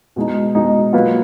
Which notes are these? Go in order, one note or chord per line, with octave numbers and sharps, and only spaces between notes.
B2 G#3 D#4
B2 G#3 D#4
F#3 A#3 F4 B4